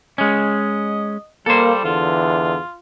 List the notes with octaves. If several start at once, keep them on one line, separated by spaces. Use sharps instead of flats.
G#3 C#4 D#5
G3 A#3 A4 C5
E2 D3 E3 F4